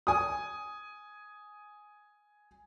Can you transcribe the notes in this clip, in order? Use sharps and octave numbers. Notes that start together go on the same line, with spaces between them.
G#5 D#6